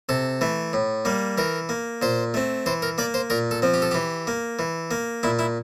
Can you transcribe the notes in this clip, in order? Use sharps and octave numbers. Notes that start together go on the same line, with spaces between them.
C3 A4
E3 A3
A2
G3 A#3
E3 A#4
A#3
A#2 C5
A3 C4
E3 C5
A#4
A#3 D5
C5
A#2 A#4
A4
F3 C4
G4
A4
E3 G4
A#3
E3
A#3
A#2 E4
E4